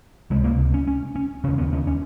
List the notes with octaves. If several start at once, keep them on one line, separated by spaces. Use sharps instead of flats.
C#2 C3 G#3
A#3
C#4
C#4
C#4
D#2 C#3 C#4
B3
C#4
C#4